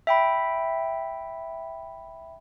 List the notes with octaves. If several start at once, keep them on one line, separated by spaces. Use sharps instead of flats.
E5 G5 B5